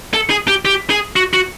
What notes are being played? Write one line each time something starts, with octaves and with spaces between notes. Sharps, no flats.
A4
G#4
G4
G4
G#4
F#4
F#4